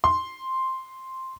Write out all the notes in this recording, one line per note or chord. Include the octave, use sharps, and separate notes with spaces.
C6